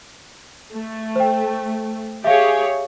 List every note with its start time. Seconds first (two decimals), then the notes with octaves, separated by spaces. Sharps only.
0.73 A3
1.16 C5 G5
2.24 G4 G#4 C#5 E5 F5